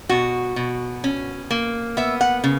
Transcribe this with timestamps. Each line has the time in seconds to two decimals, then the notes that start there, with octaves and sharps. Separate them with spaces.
0.09 B2 F#4
0.56 B2
1.04 C#4
1.51 A#3
1.97 B3 E5
2.21 F#5
2.44 C#3